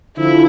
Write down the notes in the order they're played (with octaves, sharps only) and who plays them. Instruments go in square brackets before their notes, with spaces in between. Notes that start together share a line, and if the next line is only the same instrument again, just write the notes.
[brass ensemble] D3 F3 [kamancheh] E4